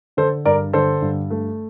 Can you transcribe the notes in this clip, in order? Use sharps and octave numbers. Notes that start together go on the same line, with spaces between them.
D3 A4 C5
G2 A#4 D5
D3 A4 C5
G2
A3